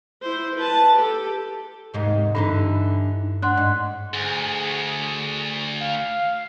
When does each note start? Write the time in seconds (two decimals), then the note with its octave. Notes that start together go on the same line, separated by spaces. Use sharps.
0.22 E4 C5
0.56 B4 A5
0.96 G4 A4
1.94 D#2 G#2 C3
2.35 G2 D3 E3 D#4
3.42 D4 F#5 C6 F#6
3.57 G#2
4.14 D2 G#4
5.82 F5